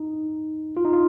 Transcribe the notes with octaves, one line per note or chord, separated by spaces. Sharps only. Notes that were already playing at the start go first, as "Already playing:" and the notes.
Already playing: D#4
F4
D#4
F4